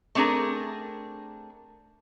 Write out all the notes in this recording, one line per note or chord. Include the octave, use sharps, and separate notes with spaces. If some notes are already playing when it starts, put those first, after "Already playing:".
A3 C4 D4 G#4 A#4